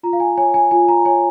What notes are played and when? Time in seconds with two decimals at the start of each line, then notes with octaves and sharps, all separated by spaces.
0.03 F4 A#5
0.13 F5
0.20 G#5
0.37 C#5 G#5
0.54 G#5
0.71 F4 G#5
0.88 A#5
1.05 C#5 G#5